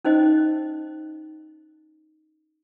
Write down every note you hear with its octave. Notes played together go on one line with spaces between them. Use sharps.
C#4 D#4 C5 D#5